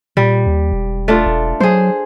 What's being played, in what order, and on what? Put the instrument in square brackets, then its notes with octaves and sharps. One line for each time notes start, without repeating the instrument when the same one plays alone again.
[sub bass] A#2 [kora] G3
[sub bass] D#2
E1
[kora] A3 D4 F4
[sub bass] E1
[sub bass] F#3 [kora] G#4 C5